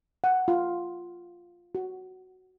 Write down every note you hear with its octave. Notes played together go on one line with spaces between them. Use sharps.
F#5
F4
F#4